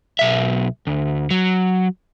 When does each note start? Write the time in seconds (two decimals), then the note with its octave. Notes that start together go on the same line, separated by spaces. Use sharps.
0.19 B1 E5
0.87 D2
1.30 F#3